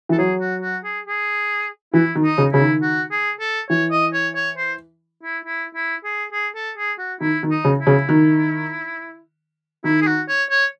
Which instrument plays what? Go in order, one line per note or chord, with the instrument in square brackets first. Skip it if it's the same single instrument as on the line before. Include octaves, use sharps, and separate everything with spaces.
[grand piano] E3 [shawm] A4
[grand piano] F#3 [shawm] G#4
[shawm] F#4
F#4
G#4
G#4
[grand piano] E3 [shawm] E4
[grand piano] D#3
[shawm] D#4
[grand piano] C#3
[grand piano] C#3 [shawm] E4
[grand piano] D#3
[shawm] F#4
G#4
A4
[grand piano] E3 [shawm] C#5
[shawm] D#5
C#5
C#5
C5
E4
E4
E4
G#4
G#4
A4
G#4
F#4
[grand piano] D#3 [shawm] E4
[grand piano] D#3
[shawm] D#4
[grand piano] C#3
[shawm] E4
[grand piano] C#3
D#3
[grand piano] D#3 [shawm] E4
[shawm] G#4
F#4
C#5
C#5